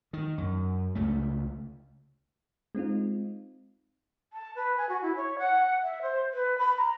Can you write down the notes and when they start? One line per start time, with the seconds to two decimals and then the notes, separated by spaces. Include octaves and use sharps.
0.13 D#3
0.38 F#2
0.95 C#2 C#3 A3
2.75 G#3 C4 D#4 F4
4.33 A5
4.56 B4
4.78 G#5
4.89 F#4
5.02 E4
5.16 C#5
5.39 F#5
5.83 E5
6.02 C5
6.33 B4
6.58 B5
6.78 A#5